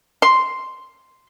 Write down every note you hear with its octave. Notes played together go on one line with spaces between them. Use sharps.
C6